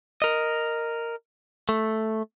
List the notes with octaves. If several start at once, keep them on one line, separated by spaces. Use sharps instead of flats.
A#4 D#5
A3